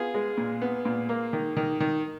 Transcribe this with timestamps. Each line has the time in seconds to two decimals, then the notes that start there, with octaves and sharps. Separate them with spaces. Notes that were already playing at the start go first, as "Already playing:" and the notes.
Already playing: B3 F4 G#4
0.14 G#3
0.37 A#2
0.62 B3
0.85 A#2
1.09 A#3
1.33 D#3
1.57 D#3
1.80 D#3